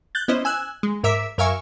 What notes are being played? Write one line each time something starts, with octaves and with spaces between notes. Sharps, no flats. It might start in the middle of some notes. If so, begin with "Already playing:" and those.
F#6 G6 A6
B3 C#4 E4 C5 D#5
G#5 E6 F#6
G#3
G#2 A#4 E5 D6 E6 B6
F#2 A#4 E5 F5 G#5 C#6